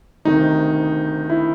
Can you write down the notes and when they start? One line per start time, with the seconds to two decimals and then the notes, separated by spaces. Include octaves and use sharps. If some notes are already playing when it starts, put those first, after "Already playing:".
0.25 D2 C3 D#3 D#4
1.29 E4